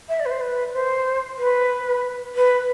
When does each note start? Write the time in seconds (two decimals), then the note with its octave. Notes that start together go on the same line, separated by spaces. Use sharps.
0.09 E5
0.20 D5
0.26 B4
0.31 C5
0.41 B4
0.73 C5
1.38 B4
2.35 B4